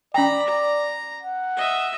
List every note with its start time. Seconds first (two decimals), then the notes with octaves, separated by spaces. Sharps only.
0.14 C#4 D5 G5 A#5 B5
0.47 A#5
1.22 F#5
1.56 D#5 E5